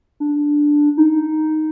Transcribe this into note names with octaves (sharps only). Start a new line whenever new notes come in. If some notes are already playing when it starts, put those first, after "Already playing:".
D4
D#4